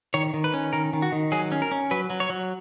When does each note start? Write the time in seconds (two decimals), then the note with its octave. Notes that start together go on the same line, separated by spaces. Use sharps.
0.14 D#3 C#5
0.34 D#3
0.44 B4
0.54 C#4
0.73 D#3 A#4
0.93 D#3
1.02 F#4
1.12 D#3
1.32 F#3 G#4
1.52 C#4
1.62 A#4
1.71 C#4
1.91 F#3 B4
2.10 F#3
2.20 C#5
2.30 F#3